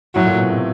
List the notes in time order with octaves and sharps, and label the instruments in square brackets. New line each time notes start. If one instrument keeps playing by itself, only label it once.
[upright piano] A2 [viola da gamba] F#3
[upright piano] A#2
B2
C3